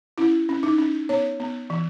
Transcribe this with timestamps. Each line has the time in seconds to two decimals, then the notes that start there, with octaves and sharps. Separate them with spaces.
0.18 C#4 E4
0.49 C#4
0.63 D#4
0.78 C#4
1.09 B3 C#5
1.40 B3
1.70 E3